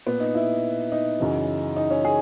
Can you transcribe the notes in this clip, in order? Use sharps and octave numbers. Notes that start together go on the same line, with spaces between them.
A#2 B3
D#4
E4
D#4
F#2 C#3 E3
D#4
C#4
G#4